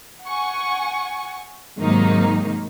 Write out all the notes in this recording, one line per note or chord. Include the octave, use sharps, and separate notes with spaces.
F#5 G#5 C#6
G#2 C3 D#3 F#3 A#3 D#4